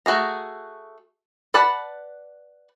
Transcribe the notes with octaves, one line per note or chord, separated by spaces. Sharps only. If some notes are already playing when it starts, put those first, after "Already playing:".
A3 F#4 G#4 A#5
B4 D5 F#5 A5 B5